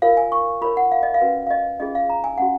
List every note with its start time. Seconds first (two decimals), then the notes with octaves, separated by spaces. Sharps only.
0.02 F4 A#4 C#5 F5
0.17 G#5
0.32 C#6
0.61 F4 A#4 C#5 B5
0.77 F#5
0.92 F5
1.03 D#5
1.14 F5
1.21 C#4 F#4 B4
1.47 F5
1.51 D#5
1.80 C#4 F4 G#4 D#5
1.95 F5
2.10 A#5
2.24 G#5
2.38 C#4 F#4 F#5